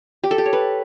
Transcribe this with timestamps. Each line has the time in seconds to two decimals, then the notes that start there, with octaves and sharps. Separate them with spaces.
0.24 G4
0.31 A4
0.38 G4
0.45 C#5
0.53 B4